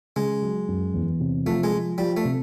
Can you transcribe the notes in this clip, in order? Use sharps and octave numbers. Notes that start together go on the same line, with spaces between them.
C#3 G#3
F#3
F#2
E2
C3
F3 A3
G#3
F3
F3 G3
A3
C3